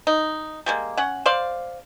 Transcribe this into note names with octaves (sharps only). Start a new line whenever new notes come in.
D#4
G3 G#3 A#3
C#4 F#5
C5 D5 F5